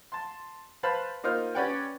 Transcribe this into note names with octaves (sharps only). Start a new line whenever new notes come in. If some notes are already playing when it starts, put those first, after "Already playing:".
A5 C6
B4 C5 F5 A5 B5
A#3 D#4 F4 C5 F6
C#4 G4 B4 D5 F#5 G5